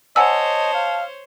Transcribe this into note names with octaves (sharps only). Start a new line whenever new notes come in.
C5 C#5 D#5 F#5 G#5 A5 E6
F5